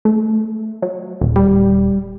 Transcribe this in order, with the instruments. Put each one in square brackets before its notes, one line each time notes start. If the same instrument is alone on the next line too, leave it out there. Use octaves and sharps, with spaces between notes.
[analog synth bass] A3
F#3
D#1
[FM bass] G3